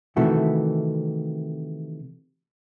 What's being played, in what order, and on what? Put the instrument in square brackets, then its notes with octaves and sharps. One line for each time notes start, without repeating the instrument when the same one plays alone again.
[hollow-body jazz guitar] C3 D#3 E3 A3 F#4